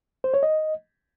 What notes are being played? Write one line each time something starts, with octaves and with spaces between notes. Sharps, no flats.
C5
C#5
D#5